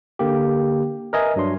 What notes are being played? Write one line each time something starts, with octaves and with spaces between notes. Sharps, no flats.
D3 A#3 G4
A#4 B4 D#5 E5 G#5
G2 F#3 D4 C6